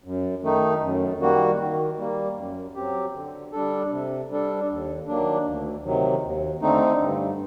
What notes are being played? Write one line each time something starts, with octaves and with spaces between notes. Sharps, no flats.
F#2
D#3 A3 D#4
F#2
D#3 G3 A#3 F#4
D#3
G3 A#3
F#2
F#3 C4 G4
D3
G3 D4 A4
C3
G3 D4 A4
D#2
D#3 F#3 A#3 D4
D2
C3 D#3 F#3
D#2
D3 A3 C4 D#4
G2